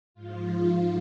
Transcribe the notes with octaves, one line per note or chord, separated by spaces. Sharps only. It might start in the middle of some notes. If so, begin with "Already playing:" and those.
G#2 F3 F4